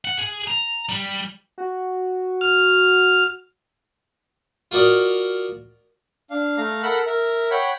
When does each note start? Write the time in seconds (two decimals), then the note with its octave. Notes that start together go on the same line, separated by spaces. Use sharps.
0.05 F#5
0.18 G#4
0.48 A#5
0.89 G3
1.58 F#4
2.41 F6
4.71 F4 F#4 A#4 D5 D#5
6.30 D4 F5
6.57 A3 F5 A#5
6.83 A4 A#4 F#5 B5 E6 F#6
7.06 A#4 E5
7.51 C#5 F#5 G5 B5